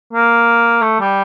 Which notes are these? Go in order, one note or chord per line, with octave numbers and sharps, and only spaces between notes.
A#3
A3
G3